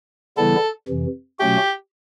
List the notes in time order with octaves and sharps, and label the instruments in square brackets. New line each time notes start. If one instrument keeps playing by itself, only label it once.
[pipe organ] C#3 E3 G3 B3 E4 [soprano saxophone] A4
[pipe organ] F2 C3 E3
[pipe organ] B2 F#3 A3 C#4 F#4 [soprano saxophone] G4